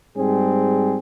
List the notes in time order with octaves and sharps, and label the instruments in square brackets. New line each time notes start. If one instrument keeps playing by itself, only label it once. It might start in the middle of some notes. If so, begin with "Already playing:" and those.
[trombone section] G#2 G3 C4 G#4